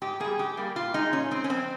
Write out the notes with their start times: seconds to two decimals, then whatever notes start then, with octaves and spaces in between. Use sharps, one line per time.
0.02 G#2 G4
0.20 G3 A#3 G#4
0.39 G#2 G4
0.57 G3 A#3
0.76 A#2 F4
0.94 G#3 D#4
1.12 A#2 C#4
1.31 G#3 C4
1.44 C#4
1.50 F2 C4